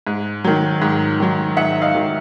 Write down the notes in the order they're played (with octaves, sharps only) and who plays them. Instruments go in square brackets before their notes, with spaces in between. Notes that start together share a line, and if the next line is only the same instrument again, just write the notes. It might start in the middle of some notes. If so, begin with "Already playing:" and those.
[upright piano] G#2
D#3 F#3
G#2
D#3 F#3
G#2 E5 F#5
D#5 F5
D#3 F#3